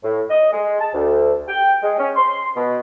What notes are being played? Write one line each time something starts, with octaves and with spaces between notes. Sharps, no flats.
A2
D#5
G#3
A5
D2
G5
G#3
C#4
C6
B2